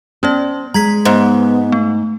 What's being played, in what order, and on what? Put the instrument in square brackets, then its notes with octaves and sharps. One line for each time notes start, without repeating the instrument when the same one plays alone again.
[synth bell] B3 C#4 D5 [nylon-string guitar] C5
[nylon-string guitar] G#3 [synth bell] A#5 G#6 B6
[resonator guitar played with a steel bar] G#2 [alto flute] B3 [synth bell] C5
[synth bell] A3